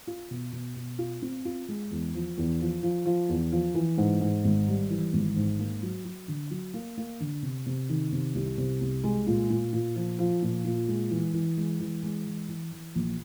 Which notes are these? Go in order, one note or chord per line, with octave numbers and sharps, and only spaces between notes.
F4
B2
B2
B2
F4
C4
F4
G#3
E2
F3
E2
F3
F3
F3
E2
F3
E3
G#2
G#2
G#1
G3
E3
G#1
G#2
A#3
F#3
F#3
D3
F#3
A#3
A#3
D3
C3
C3
D#3
C3
C2
C3
C2
G#3
A#2
A#2
A#2
F3
F3
A#2
A#2
G#3
E3
E3
G#3
E3
G#3
E3
E3
E3
A#1